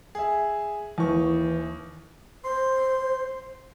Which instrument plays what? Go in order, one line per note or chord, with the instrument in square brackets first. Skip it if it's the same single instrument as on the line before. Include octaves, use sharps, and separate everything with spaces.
[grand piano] G#4 E5
[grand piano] D#2 C#6 [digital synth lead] E3
[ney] C5 [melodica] C6